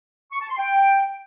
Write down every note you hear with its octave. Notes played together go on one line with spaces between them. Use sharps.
C#6
A5
C6
G5